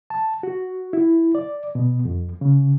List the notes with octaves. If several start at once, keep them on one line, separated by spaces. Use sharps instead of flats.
A5
F#4
E4
D5
B2
F2
C#3